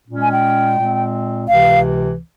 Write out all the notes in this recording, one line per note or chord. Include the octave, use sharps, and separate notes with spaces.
A#2 G#3 C#4
G#5
G5
A#2 G#3 C4
C#2 C3 E3 F5